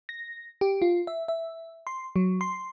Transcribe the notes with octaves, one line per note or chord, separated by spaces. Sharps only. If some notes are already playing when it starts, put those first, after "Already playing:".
A#6
G4
F4
E5
E5
C6
F#3
C6